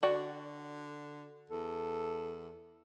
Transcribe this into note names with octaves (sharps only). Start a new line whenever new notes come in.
D3 F#4 D5 G5
E2 A4